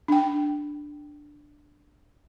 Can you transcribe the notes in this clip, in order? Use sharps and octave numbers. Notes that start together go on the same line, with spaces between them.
D4 G5